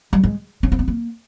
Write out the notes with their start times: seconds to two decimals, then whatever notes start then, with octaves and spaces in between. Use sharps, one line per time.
0.13 G3
0.24 G#3
0.63 C#4
0.72 C4
0.79 B3
0.88 A#3